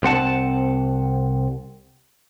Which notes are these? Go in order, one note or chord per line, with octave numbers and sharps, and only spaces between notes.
C2 C4 F#5 A5